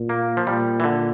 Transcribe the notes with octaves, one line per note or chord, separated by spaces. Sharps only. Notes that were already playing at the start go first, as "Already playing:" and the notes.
Already playing: A#2
A#3
F3
A#2 G3
E3
D3